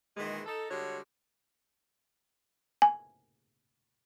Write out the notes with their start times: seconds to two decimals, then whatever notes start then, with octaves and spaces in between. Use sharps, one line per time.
0.17 A#2 D#3 E3 G#3
0.47 D#4 A4
0.70 D3 G3 G#3 F#4 C#5
2.82 G#5